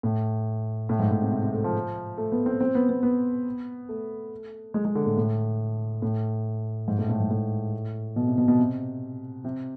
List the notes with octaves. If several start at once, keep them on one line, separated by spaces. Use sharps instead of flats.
A2
A2
G#2
A2
C3
C3
C3
A3
F3
A3
B3
C4
C4
B3
B3
B3
A3
G#3
G#3
D3
A2
A2
A2
G#2
A2
A2
G#2
A2
B2
C3
B2
B2
C3
C3